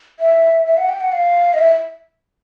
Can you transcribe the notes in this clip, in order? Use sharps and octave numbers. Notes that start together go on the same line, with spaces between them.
E5
E5
F#5
G5
F#5
F5
D#5
E5